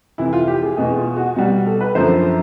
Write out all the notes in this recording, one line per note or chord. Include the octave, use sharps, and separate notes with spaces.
F2 C3 E3 E4
F4
G4
G#4
E2 B2 G#3 G#4
F4
F#4
B2 G3 F#4
A4
B4
F#2 D3 F3 C5